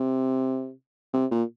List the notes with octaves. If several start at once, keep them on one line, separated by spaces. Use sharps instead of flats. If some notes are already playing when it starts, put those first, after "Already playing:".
Already playing: C3
C3
A#2